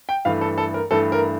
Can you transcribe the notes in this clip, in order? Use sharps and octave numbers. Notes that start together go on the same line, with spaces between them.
G5
G2 E3 A3 F5
A4
A4
A#4
G2 E3 A3 A4
A#4